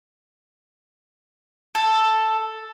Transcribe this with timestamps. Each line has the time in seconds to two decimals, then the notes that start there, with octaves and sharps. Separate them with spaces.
1.75 A4